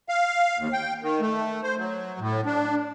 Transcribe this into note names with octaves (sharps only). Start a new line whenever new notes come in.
F5
D#2
G5
D#3
A3
C5
F#3
A2
D4